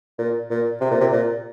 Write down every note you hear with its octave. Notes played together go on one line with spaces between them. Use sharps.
A#2
A#2
C3
A#2
C3
A#2